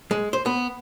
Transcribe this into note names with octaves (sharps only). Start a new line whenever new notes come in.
G#3
C5
B3